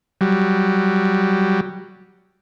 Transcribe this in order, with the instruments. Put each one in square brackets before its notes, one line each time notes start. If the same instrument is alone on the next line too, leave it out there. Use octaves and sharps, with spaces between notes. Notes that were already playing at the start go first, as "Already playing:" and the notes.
[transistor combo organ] F#3 G3